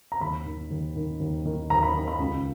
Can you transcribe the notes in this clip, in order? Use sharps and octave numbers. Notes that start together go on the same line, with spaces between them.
A#5
D#2 B5
D#3
D#2
D#3
D#2
D#3
D#2 A#5
B5
D#3
B5
C#2